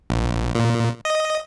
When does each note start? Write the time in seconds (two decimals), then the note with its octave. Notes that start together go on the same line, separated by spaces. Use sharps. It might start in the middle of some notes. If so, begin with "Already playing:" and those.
0.10 A#1
0.55 A#2
1.05 D#5